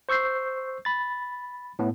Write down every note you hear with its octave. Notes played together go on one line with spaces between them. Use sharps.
C5 C#6 E6 G6 C7
B5 A6
A2 B3